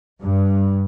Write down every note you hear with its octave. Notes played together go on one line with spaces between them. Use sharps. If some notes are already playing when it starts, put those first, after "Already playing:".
G2